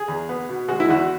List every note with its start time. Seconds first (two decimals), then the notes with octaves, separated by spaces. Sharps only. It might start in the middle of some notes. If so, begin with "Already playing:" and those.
Already playing: G#4
0.08 E2
0.29 B3
0.49 B2
0.68 G#3 F#4
0.80 E4
0.88 E2 F#4